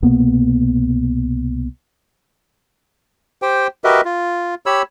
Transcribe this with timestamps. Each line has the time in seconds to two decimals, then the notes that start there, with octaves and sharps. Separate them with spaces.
0.02 C2 B2 A#3 B3
3.42 G4 C5 G5
3.84 F#4 G4 A#4 B4 D#5 E5
4.05 F4
4.66 G4 C#5 B5 E6